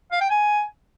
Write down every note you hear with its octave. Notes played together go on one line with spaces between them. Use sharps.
F5
G5
G#5